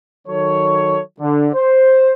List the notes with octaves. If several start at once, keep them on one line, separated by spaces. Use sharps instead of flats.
D#3 F#3 A4 C#5
D3
C5